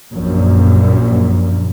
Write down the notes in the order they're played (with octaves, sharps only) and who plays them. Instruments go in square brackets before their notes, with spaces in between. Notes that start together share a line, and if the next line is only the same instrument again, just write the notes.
[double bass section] A#1 F#2 A#2